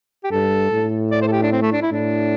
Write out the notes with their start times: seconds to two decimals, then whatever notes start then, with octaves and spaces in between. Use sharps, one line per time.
0.24 G4
0.31 G2 A4
0.72 A2
1.11 D5
1.22 C5
1.27 A4
1.32 G4
1.42 D4
1.52 C4
1.62 A3
1.72 D4
1.82 E4
1.91 A2 D4